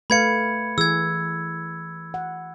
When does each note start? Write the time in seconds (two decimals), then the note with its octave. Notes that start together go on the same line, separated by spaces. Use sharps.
0.10 A3 B4 F5 B5 G#6 C#7
0.78 E3 G#4 E6 G#6
2.14 F#5